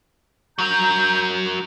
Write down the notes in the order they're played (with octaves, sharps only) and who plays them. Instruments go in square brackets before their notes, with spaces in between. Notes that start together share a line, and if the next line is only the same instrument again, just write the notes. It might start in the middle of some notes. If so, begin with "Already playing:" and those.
[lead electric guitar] F#3 A#4 [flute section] A#5 G6